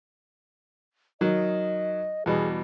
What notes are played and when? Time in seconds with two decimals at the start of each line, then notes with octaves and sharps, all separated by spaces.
1.21 D#3 F#3 D#5
2.26 E2 B2 G3 G#4